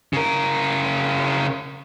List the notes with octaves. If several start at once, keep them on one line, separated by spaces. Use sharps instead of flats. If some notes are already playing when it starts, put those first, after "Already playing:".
C#3 A#4